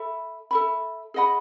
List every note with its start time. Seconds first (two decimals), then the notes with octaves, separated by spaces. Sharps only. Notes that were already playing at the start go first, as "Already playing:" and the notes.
Already playing: A4 E5 B5
0.51 A4 E5 B5
1.14 G#4 D#5 F#5 B5